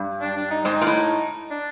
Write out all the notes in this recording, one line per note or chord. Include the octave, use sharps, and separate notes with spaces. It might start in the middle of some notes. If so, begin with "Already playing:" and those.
Already playing: G2
D4
D4
D#4
G#2 C4 D#4
A#2
A2
D4